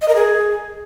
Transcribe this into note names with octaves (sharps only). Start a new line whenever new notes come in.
D#5
A#4
G#4